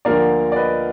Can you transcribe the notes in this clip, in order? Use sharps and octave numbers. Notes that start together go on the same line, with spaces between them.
D2 D3 F3 A#3 A#4 D5
D5
B4 D#5